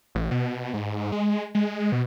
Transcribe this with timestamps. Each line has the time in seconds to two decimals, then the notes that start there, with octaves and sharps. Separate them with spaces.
0.15 A1
0.31 B2
0.74 G#2
1.12 G#3
1.55 G#3
1.92 B2